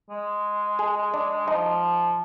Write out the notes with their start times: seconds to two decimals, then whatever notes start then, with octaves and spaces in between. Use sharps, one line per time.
0.10 G#3
0.79 G#4
1.14 D4
1.48 F3 D#4